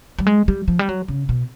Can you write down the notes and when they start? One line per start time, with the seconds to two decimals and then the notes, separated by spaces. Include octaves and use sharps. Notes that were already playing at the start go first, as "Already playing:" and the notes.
0.19 G3
0.27 G#3
0.48 G3
0.68 F3
0.79 G3
0.89 F#3
1.08 C#3
1.29 B2